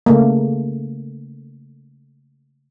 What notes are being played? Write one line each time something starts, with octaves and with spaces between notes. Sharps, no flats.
C#3 A3 A#3